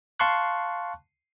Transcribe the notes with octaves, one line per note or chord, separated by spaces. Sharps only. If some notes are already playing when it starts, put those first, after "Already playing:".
F5 A5 C6 C#6 F#6